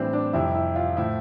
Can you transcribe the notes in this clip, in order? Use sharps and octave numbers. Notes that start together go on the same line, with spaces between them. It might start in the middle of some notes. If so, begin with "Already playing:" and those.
Already playing: A2 E3 G3 C4 D4
D4
F2 C3 G3 E4
E4
F4
A2 F3 E4